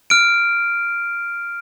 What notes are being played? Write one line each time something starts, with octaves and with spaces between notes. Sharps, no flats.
F6 D7